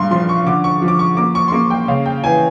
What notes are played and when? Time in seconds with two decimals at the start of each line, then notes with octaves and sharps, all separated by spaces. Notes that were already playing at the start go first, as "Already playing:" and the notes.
Already playing: G2 A#2 C6
0.11 F3 C6
0.29 C#6
0.46 D3 D6
0.64 C#6
0.82 F3
0.88 D6
0.99 C#6
1.17 A#3 D6
1.35 C#6
1.48 C6
1.52 A#3 C#6
1.70 G5
1.88 C#3 F5
2.06 G5
2.24 E3 G#5